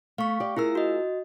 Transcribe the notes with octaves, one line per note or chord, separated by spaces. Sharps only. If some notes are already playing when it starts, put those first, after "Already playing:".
A3 F5 C#6
G4 D5
E4 F4 G#4 A#4 E6
F#4 D#5